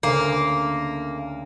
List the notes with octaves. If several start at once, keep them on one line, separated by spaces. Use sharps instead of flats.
D2 C#3 A#3 C7